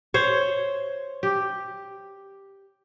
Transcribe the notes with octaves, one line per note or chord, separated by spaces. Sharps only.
C5 C#5
G4